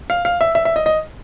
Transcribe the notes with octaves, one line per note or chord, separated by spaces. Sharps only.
F5
F5
E5
E5
E5
D#5
D#5